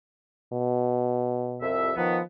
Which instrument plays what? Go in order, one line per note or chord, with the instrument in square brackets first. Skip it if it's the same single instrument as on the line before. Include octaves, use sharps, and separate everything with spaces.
[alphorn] B2
[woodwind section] C2 F2 E5
[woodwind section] D#3 B3 [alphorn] F3